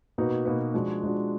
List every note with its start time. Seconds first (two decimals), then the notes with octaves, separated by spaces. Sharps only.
0.18 B2 A#3 D#4 F#4 B4
0.45 B2 A#3 D#4 F#4 B4
0.73 F3 G#3 D4 F#4
1.02 F3 G#3 D4 F#4